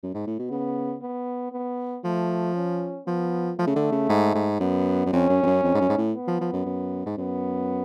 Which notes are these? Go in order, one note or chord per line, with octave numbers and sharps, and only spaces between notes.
F#2
G#2
A2
B2
C#3 B3
B3
B3
F3 A3
C#4
F3 B3
F3 A3
C#3
D3
C#3
G#2
G#2
F#2 B3
F#2
F2 C#4
F#2
F2
F#2
F2
G#2
F#2
G#2
A2
B3
F3
F3
F#2
F#2
G#2
F#2 B3